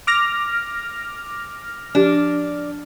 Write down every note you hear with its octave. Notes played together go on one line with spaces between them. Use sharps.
D6 F6 A#6
F3 D4 G4